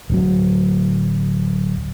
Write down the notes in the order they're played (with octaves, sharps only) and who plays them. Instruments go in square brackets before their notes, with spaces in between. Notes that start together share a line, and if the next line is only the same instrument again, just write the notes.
[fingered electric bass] D1 F#3